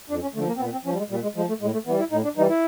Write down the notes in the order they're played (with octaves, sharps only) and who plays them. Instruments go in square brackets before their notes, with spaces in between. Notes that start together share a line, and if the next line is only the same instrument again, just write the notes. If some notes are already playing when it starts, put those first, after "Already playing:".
[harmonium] F2 D4
C#4
D3 A3
F3
A#3
C4
A#2 B3
C4
F3 C#4
G3
G#3
A#2 G3
G#3
F3 G#3
A3
A2 G#3
A3
E3 B3
G3
E4
A2 D#4
D4
E3 G3 D#4
E4